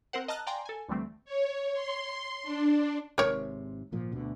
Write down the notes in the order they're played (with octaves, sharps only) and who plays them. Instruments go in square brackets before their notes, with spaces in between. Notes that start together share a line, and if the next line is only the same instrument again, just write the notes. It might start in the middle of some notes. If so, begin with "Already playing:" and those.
[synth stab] C4 A#4 C5 F#5
D#5 A5 A#5 F6 F#6
D5 F5 G5 G#5 A#5 C6
A4 G#5
D2 D3 E3 G3 A3 C4
[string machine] C#5
C6
D4
[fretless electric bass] G#1 G#2 C3 [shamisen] A#4 C#5
[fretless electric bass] G#1 A#2 F3
D2 B2 D3